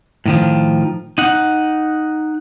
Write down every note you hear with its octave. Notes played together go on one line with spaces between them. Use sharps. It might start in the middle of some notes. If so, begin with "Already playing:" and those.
A2 D#3 F3
D#4 F#5